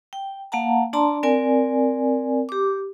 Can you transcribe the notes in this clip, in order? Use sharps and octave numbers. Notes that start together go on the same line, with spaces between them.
G5
A#3 F5 F#5 A5 A#5
D4 D5 A5 A#5 C6
C4 A#4 D5 G#5
G4 D6